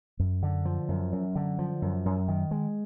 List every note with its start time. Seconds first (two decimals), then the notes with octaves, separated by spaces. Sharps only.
0.19 F#2
0.43 D3
0.65 F3
0.89 F#2
1.13 F#2
1.36 D3
1.59 F3
1.82 F#2
2.06 F#2
2.28 D#3
2.51 G#3